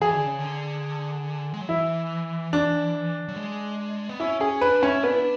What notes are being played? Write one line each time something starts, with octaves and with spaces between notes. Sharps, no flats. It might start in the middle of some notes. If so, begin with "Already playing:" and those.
E3 G#4
D3
C#3
D3
G#3
F#3
E3 E4
D4
F#3
G#3
B3
C#4 E4
C#4 G#4
D4 B4
C#4 E4
B3 D4
E4
D4